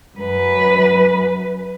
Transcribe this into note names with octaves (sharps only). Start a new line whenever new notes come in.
F#2 B4